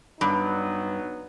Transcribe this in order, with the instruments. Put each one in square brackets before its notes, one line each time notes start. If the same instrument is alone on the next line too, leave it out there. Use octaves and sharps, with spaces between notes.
[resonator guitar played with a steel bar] G2 [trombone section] F#3 B3 D#4